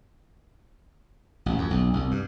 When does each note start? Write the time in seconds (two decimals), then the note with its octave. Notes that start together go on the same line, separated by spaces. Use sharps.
1.46 A1
1.58 F2
1.71 B1
1.93 C2
2.11 G2